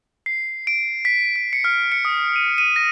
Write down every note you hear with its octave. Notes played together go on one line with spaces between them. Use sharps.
C7
D7
B6
B6
C#7
F6
C#7
D#6
D#7
D#7
A#6